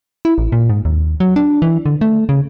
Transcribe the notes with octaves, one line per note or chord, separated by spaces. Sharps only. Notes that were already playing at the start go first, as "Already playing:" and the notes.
E4
A1
A#2
G#2
D#2
F#3
D4
E3
D3
A3
C#3